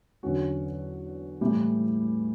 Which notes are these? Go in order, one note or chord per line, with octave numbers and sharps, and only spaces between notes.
E2 D3 F#3 C#4 F#4
A2 E3 G3